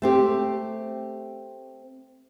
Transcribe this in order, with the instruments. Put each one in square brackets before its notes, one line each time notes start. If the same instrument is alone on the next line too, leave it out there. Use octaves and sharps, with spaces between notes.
[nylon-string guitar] A3 C4 G4